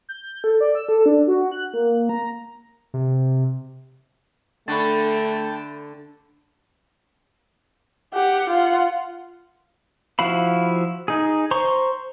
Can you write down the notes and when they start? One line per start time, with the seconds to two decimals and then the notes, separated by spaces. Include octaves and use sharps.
0.09 G6
0.44 A4
0.60 D5
0.75 E6
0.89 A4
1.06 D4
1.28 F#4
1.52 F#6
1.74 A#3
2.09 A#5
2.94 C3
4.68 D3 A3 G5 A5 B5 C#6 A6
8.14 G4 F#5
8.50 F4 F#5
10.19 F3 E4 F#4 F5 B5
11.08 D#4 G#4
11.51 C5 A#5 C6 C#6